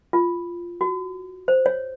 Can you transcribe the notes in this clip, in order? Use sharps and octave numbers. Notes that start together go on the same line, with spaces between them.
F4
F#4
C5
C#5